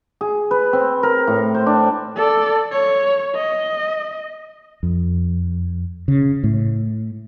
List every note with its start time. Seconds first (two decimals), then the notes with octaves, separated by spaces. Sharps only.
0.21 G#4
0.51 B4
0.73 C4
1.03 A#4
1.27 A2
1.55 C5
1.66 D4
2.16 A4 D5
2.72 C#5
3.35 D#5
4.83 F2
6.08 C#3
6.44 A2